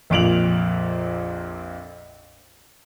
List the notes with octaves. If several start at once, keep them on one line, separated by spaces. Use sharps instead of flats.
A#1 F2 A#2 D7 F7 F#7